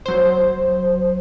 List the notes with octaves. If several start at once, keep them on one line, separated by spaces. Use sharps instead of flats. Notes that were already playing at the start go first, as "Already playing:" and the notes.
F#3 C5